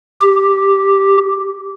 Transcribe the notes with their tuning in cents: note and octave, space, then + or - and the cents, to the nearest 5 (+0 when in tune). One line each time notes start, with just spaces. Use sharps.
G4 +0